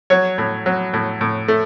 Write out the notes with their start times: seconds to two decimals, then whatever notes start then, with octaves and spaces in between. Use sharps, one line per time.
0.10 F#3 C#5
0.38 A2
0.66 F#3
0.93 A2
1.21 A2
1.48 A3